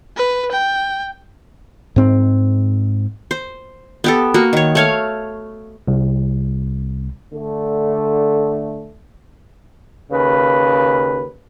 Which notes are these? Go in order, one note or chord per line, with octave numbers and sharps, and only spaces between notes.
B4
G5
G#2 C4
C5
B3 G4 A4
A#3 F#4
D#3 C#5
A3 C#5 F5
C2
D3 A3
D#2 C#3 B4